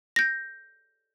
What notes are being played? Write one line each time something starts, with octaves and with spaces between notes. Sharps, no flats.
G6 A#6